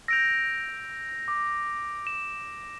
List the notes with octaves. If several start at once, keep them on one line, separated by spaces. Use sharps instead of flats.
E6 G6 A#6 D7 F7
D6
E7